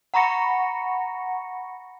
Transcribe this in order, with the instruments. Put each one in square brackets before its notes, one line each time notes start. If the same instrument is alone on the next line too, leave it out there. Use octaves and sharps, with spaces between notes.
[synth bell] F#5 A#5 B5 C#6 A#6 C#7